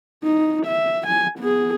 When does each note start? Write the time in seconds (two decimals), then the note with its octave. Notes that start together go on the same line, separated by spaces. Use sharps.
0.24 D#4
0.66 E5
1.07 G#5
1.39 B3 G#4